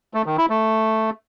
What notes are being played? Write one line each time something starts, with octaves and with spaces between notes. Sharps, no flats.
A3
D#3
E4
A3